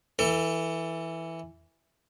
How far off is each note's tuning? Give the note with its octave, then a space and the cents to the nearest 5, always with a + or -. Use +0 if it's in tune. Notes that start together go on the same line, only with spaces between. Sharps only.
E3 +0 A4 +25